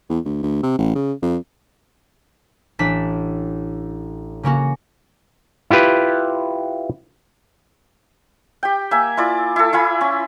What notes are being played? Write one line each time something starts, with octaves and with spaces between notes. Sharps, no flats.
E2
D2
D2
C3
A1
C#3
F2
A1 D4 B6 E7
C#3 A#3 C#4 F#4
E4 F4 G4 B4
G4 G5
A#3 E5 G#5
E4 F4 D5
E4 A4
E4 F4 G#5 B5
C#4